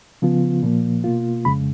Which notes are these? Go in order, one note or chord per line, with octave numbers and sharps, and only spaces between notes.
C#3 F3 B3 F4
A#2 F3 A#3
B2 A#3 F4
F2 C#3 G#3 B5